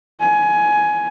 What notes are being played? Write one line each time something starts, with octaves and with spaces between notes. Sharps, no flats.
G#5